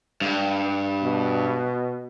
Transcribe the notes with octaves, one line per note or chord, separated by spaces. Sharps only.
G2
B2